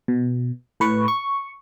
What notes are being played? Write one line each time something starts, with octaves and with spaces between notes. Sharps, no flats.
B2
A2 B4 C#6
C#6